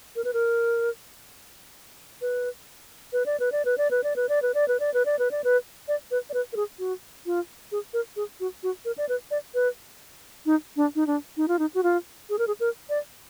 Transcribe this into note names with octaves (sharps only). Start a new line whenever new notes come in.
A#4
B4
A#4
B4
B4
D5
B4
D5
B4
D5
B4
D5
B4
D5
B4
D5
B4
D5
B4
D5
B4
D5
B4
D5
B4
D5
B4
A#4
G#4
F#4
F4
G#4
A#4
G#4
F#4
F#4
A#4
D5
B4
D5
B4
D#4
D4
D#4
D4
D#4
F4
D#4
F#4
F4
G#4
A#4
G#4
A#4
D5